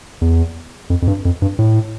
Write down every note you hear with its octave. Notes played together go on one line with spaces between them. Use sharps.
E2
F2
F2
G2
F2
G2
A2